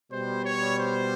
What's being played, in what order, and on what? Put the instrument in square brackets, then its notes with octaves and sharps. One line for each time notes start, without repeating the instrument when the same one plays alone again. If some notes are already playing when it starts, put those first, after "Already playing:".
[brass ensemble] B2 G3 C5
C#5
C5